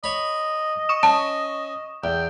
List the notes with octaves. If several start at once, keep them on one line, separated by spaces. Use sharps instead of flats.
C#5 D#5 B5
C#6 D#6 E7
C#4 A5
E2 G5